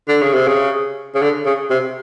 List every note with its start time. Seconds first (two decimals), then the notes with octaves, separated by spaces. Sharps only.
0.09 D3
0.22 C#3
0.34 C3
0.48 C#3
1.15 C#3
1.22 D3
1.46 C#3
1.70 C3